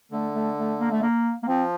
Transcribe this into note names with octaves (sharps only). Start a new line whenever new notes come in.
D3 A3
A3
A3
A#3
A3
A#3
A#3
F3 C4